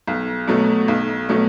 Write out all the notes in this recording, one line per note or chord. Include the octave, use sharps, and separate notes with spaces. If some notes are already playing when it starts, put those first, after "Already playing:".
B1
B2 F#3 A3
B1
B2 F#3 A3